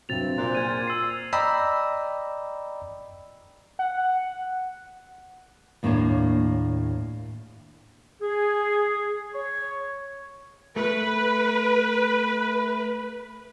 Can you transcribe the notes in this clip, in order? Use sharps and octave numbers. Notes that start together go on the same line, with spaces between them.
G2 C3 F#3 C4 A6 F7
A#2 C5 F#6
G#4 F6 G#6 D#7
G5 A6
E6 C7
D5 D#5 G5 A#5 B5 E6
F#5
D#2 A2 A#3 D4 C#5
G#4
C#5
A3 B4